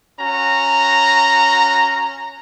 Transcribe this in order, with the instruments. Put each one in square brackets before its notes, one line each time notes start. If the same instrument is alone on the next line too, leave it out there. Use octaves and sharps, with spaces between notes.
[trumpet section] C#4 F#4 A#5